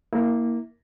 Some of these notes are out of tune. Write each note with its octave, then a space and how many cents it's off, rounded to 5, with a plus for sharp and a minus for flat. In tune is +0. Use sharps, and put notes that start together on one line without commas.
A#3 +0 E4 -25